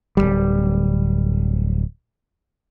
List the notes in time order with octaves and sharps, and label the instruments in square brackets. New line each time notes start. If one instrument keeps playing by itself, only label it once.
[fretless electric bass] D1 A#1 G3